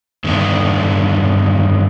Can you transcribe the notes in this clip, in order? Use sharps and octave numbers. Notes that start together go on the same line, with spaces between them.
G2 D3 D#3 A3 B3 D4